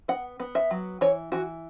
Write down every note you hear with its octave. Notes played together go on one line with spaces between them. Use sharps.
B3 F#5
B3
E5
F#3
E3 C#5
E3 F#4